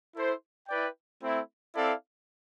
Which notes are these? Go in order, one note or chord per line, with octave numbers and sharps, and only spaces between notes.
E4 A4 C5
E4 B4 D5 G5
A3 C4 E4
C4 E4 A4 D5 F5